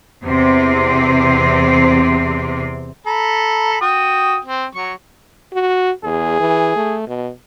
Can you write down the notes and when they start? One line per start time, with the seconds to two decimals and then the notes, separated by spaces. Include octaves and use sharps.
0.24 E2 C3 C4
3.06 A4 A#5 B5
3.81 F#4 G5 D#6
4.45 C4
4.75 F#3 C#6
5.53 F#4
6.04 E2 G#4
6.40 E3
6.76 A3
7.08 B2